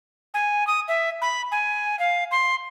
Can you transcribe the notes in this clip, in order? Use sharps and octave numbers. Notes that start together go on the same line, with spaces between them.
G#5
D#6
E5
B5
G#5
F5
C6